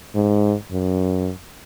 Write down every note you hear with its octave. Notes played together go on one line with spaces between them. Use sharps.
G#2
F#2